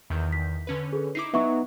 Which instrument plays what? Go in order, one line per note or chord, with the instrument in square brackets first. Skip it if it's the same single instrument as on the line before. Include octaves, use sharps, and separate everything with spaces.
[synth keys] E2 D#3 G6
[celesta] B6
[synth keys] D3 C#4 B4
[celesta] G#4 A4
[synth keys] D#4 E4 D6 [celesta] C7
[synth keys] F#3 [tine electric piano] B3 D#4 [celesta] E5 C#6